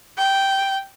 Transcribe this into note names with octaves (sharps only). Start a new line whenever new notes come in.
G5